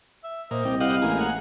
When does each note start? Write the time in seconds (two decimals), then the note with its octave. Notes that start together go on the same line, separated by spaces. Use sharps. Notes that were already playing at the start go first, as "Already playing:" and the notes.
0.24 E5
0.51 A#2 C5 D#5
0.65 C2 G3
0.80 E4 G4 D#5 F5 F#5
1.02 A1 G#3 A#3
1.19 F#5